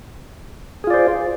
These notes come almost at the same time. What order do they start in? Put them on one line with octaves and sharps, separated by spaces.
G#4 F4 D5 C5